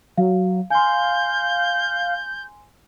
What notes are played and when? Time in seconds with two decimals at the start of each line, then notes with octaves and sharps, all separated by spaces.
0.18 F#3 F5
0.70 F5 G#5 C6 G6